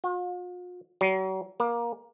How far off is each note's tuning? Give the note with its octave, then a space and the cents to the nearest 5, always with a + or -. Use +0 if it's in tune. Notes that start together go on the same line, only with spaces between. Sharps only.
F4 +45
F#3 +40
A#3 +20